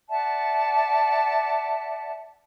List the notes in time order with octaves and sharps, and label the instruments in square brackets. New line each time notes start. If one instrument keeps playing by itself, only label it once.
[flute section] D5 E5 F#5 A5